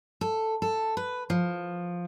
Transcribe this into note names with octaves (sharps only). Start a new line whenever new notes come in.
A4
A4
B4
F3